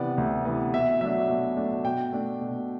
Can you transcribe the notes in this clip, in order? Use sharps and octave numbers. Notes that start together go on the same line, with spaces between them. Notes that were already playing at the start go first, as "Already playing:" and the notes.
Already playing: C3 E3 B3 D5
D2
C3 E3 B3
B2 E5
F#3 A3 D4 E5
B2
F#3 A3 D4
B2 G5
A3 D4
B2